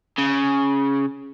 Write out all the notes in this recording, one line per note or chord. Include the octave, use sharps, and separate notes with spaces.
C#3